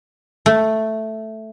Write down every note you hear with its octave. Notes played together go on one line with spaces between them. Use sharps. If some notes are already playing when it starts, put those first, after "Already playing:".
A3